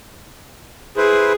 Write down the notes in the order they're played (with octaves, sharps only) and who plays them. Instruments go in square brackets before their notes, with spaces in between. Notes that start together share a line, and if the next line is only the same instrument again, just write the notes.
[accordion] E4 B4 C5 [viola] G#4